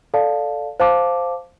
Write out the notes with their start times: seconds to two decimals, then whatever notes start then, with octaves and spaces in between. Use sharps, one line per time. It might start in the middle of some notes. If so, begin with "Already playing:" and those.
0.14 A4 D5 F5 A5
0.80 C5 F5 A5 D6